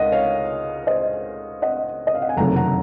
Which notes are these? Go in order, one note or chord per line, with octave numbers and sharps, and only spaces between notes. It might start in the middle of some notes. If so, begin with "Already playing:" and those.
Already playing: C#2 G#3 D#4 A#4 D#5 F#5
C#5 F5
C5 D#5
D#5 F#5
D#5
F5
F#5
G#5
F#1 F2 C3 D#3 F#3 F#5 A#5
F#5 A#5